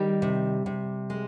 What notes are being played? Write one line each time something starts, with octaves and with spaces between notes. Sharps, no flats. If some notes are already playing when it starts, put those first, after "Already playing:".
Already playing: D#3 G3 G4
C3
C3
G#3